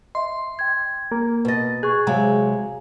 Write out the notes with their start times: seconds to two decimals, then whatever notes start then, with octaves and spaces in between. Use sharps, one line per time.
0.15 D#5 E5 C6
0.59 G5 G#6
1.12 A#3
1.45 B2 B4 D#5 A6
1.83 G#4 C#6 F#6
2.07 C3 F#3 G#3 F5 G#5 A#5